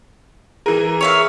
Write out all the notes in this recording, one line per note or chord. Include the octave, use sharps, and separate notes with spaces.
E3 G#4 A#4
C#5 E5 F5